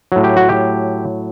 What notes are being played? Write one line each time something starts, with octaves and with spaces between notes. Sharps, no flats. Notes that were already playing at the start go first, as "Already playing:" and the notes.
A2 F#3
G4
F#4
G4